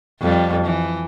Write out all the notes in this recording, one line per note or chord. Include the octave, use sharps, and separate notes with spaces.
F2 G3
E3